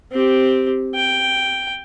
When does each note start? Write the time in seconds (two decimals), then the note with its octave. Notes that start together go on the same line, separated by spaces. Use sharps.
0.12 C4 G4
0.95 G5